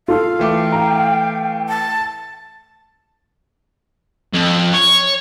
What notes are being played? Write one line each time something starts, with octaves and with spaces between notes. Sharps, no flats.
F4 A4 F5
E3 A3 G5 D6
A#5
A5
F2
C#5